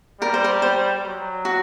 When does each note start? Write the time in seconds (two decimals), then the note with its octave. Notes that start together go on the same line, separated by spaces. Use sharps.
0.21 G3 A#4
0.34 C5
0.44 A#4
0.62 C5
1.04 F#3
1.45 F#4